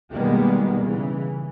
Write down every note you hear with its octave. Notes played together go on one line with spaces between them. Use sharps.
B2 D#3 G3 G#3 A#3 B3
C#3 E3